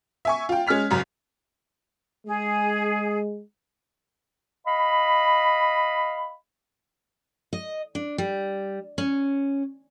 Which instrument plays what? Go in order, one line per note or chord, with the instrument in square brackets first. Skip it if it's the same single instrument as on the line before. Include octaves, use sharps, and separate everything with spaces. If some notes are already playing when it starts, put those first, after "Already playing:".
[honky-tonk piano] E5 G#5 C#6
F4 G5
G#3 C#4 F6 B6 F7
F#1 F#2 A#5 F7
[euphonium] G#3 [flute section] G#4
[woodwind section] D#5 F5 B5
[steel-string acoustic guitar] D#5
D4
G3
C#4